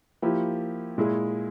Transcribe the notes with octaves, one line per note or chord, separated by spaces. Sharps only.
F3 A#3 E4 G4
A#2 G#3 E4 G#4